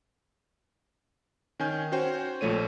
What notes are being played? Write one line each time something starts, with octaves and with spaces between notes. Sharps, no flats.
D#3 C#4 G#5 G6
C#4 F#4 C5 G5
A#1 F3 A3 C#5 D#7